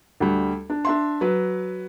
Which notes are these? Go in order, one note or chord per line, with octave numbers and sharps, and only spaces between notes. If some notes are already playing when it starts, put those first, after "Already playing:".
D2 G3
D4
D4 E5 C6
F#3 B4